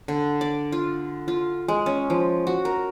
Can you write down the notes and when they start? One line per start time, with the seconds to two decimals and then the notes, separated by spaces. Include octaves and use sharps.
0.08 D3
0.41 D5
0.72 F4
1.28 F4
1.68 G#3
1.86 C#4
2.10 F3
2.47 F#4
2.65 A#4